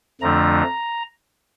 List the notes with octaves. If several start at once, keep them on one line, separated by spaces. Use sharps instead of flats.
F2 D3 F3 A3 D4 A#5